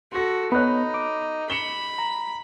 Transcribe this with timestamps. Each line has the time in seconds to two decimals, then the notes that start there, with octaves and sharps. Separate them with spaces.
0.12 F#4 A4 C6 A#6
0.52 B3 D#4 C#5 B5 F#6
0.94 D6
1.50 B5 C#7 E7 G7
1.98 A#5